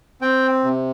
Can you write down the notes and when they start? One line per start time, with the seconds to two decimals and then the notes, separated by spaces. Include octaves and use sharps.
0.21 C4 G5
0.64 C3